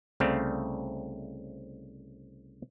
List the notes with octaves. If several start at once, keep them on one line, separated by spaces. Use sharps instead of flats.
C2 C#3 A3 C4 D5 F5